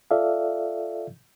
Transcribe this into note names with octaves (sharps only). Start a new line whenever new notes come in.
F4 A4 D5 E5 F5